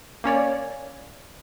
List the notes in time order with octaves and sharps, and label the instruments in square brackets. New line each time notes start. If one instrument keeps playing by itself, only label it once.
[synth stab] A#3 C#4 C#5 D5